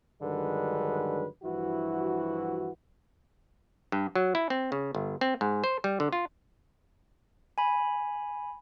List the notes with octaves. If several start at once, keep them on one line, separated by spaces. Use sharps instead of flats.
G2 D3 D#3 F#3 G#3 B4
G2 E3 F3 E4 F#4
G2
F#3
E4
C4
C#3
G1
C4
G#2
C5
G3
D3
F4
G#5 B5